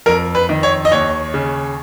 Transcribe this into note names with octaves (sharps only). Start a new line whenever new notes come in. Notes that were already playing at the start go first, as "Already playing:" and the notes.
F2 A#4
B4
D#3
C#5
D#5
D#2 C#5
C#3